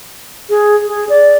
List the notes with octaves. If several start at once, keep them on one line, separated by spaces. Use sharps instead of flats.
G#4
G#4
D5